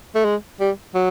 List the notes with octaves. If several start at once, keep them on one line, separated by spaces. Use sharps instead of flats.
A3
G#3
G3
F#3